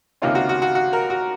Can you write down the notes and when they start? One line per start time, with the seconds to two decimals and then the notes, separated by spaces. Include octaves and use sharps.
0.22 C#2 C3 D#3 A#3 C#4 F4
0.35 F#4
0.49 F#4
0.62 F#4
0.75 F#4
0.93 A#4
1.10 F#4